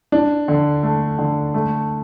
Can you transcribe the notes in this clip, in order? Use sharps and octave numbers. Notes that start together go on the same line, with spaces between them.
D4
D3
A3
D3
A3